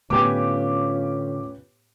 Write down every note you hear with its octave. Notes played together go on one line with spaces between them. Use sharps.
A2 D3 B3 C#4 F4 G4 G#5 D6